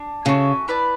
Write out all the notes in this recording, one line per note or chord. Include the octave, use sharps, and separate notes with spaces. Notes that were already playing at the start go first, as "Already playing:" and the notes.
Already playing: D4
C#3 F#4 A4 E5 G#5
E4 B4 D5 A5